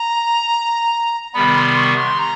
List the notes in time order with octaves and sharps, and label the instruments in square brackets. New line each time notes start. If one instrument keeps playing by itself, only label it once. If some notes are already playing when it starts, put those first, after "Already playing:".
Already playing: [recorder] A#5
[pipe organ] C3 D#3 G3 B3 [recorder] B5
[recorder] C6
C#6
C6
A#5